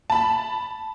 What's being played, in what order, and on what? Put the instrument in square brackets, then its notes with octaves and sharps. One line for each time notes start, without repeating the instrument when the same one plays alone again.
[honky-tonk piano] A5 B5